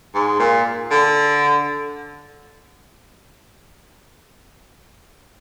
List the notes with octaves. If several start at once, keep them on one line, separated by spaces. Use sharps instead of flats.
G#2
A#2
D3